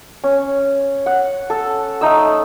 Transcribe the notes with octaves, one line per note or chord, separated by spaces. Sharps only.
C#4
F#5
A4
A3 D#4 E6